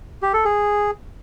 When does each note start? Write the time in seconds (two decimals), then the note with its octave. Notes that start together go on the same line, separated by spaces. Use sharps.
0.22 G4
0.34 A4
0.45 G#4